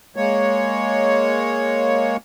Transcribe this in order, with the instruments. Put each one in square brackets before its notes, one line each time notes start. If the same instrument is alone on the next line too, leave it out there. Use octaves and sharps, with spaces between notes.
[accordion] G#3 A#3 C#5